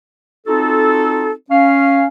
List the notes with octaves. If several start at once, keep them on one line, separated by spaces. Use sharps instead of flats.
C4 D#4 F4 F#4 A4
C#4 F5